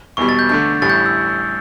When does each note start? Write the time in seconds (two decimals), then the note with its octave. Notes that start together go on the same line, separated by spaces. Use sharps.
0.17 E1 E2 B2 G3 C#6
0.29 A6
0.39 G6
0.49 D3 A3 D4 G6
0.82 A1 A2 G3 A6
0.90 G6
1.06 E6